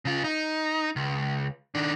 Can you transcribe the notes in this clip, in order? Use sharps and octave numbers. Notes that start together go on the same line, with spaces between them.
C#3 F4
D#4
C#2
D#3 D4